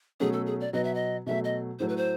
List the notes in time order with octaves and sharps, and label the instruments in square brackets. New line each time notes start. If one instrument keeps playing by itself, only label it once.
[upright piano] B2 F#3 A3 C#4 [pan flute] G#4
[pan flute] A4
G#4
D5
[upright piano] B2 F#3 B3 [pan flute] D#5
[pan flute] E5
D#5
[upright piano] B2 F#3 A3 [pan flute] E5
[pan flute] D#5
[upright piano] A2 F#3 A3 [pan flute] C5
[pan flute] B4
C5